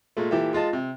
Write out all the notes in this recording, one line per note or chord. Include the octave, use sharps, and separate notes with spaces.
A#2 G#3 A3
A#2 E3 G4 A4 E5
G#3 F4 D#5 A5
C3